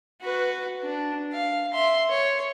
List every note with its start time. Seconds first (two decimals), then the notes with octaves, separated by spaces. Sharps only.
0.21 F#4 B4
0.82 D4
1.32 F5
1.73 E5 C6
2.09 C#5